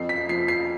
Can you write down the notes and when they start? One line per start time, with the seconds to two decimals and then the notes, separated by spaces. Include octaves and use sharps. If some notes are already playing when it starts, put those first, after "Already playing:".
Already playing: F2 C7
0.09 B6
0.29 F3 C7
0.48 C7